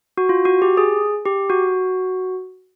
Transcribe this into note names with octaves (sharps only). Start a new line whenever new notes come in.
F#4
F4
F#4
G4
G#4
G4
F#4